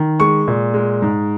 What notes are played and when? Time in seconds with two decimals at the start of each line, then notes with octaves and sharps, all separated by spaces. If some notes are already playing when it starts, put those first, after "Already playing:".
Already playing: D#3
0.20 G#3 C#6
0.48 A#2
0.74 G#3
1.02 G#2